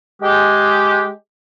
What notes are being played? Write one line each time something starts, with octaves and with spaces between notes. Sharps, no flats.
G#3 G4